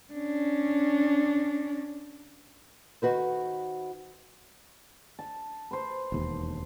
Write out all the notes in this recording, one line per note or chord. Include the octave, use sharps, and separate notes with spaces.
C#4 D4
D#3 F#4 B4 C5
A5
B4 C5
E1 D#2